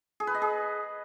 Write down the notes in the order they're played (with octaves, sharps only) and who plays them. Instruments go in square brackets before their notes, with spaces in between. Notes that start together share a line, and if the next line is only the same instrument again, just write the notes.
[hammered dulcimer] G#4
B4
D#5
G#4